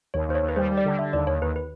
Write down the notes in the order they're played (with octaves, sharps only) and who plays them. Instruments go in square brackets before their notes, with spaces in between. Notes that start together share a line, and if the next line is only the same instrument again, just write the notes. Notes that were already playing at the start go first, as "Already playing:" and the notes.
[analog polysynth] D#2 [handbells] C#5
[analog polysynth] D#2 [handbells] C5
[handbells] C#5
[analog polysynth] D#2
[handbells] B4
[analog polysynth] G3 [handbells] C5
[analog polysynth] G3
[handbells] D5
[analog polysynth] D3
[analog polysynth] D3 [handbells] E5
[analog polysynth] D#2 [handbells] D5
[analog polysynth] D#2 [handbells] C#5
[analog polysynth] D#2 [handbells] B4
[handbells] B4